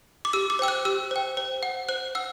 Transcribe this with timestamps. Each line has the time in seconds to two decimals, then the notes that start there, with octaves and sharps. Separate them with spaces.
0.25 D6
0.33 G4 E6
0.50 D6
0.59 C5 G5 E6
0.68 F#6
0.85 G4 E6
1.11 C5 G5
1.37 C5
1.63 F#5
1.89 C5 F#6
2.15 F#5 E6